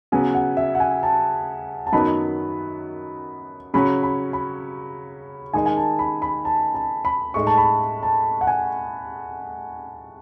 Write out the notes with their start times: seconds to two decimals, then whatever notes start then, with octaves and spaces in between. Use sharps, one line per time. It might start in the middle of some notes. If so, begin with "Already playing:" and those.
0.12 C#3 F#3 B3 G#5
0.35 F#5
0.57 E5
0.75 F#5
0.80 G#5
1.03 A5
1.87 A5
1.92 F#2 D#3 F#3 B3 D#4 B5
3.74 C#3 F#3 C#4 B5
4.03 B5
4.33 B5
5.53 D#3 G#3 D#4 G#5
5.66 G#5
5.77 A5
5.99 B5
6.22 B5
6.45 A5
6.75 A5
7.05 B5
7.34 A2 G#3 D#4 C#6
7.47 A5
7.57 B5
8.03 A5
8.41 F#5
8.47 G#5